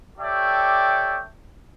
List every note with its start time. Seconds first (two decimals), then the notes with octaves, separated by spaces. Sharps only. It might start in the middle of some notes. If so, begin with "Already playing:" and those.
0.18 G4 A4 C#5 D5 E5 G5